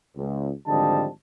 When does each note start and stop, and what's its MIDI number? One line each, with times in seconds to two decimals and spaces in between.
0.16 0.51 37
0.67 1.07 32
0.67 1.07 50
0.67 1.07 53
0.67 1.07 55
0.67 1.07 75
0.67 1.07 81